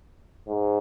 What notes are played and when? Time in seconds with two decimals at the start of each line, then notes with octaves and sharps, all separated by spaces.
0.48 G#2